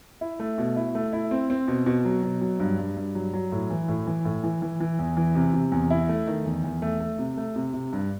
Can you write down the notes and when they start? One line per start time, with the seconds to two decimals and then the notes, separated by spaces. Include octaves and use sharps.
0.21 E4
0.40 A3
0.58 B2
0.76 E4
0.95 A3
1.13 E4
1.31 C4
1.50 C4
1.68 B2
1.86 B2
2.05 F#3
2.23 B2
2.41 F#3
2.60 G2
2.78 G2
2.97 G2
3.15 F#3
3.34 F#3
3.52 A2
3.70 E3
3.88 A2
4.07 E3
4.25 A2
4.43 E3
4.62 E3
4.80 E3
4.99 E2
5.17 E3
5.35 C3
5.54 C3
5.72 E2
5.90 E4
6.09 A3
6.27 D#3
6.46 E2
6.64 E2
6.82 A3
7.00 A3
7.19 C3
7.37 A3
7.56 C3
7.74 C3
7.93 G2